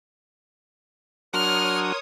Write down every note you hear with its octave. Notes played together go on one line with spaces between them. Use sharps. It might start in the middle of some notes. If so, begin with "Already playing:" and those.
F#3 D4 F#4 A#4 C#5 C6 D#6 F6